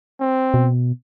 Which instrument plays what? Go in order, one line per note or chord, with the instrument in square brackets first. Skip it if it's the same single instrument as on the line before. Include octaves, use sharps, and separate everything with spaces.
[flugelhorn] C4
[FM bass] B2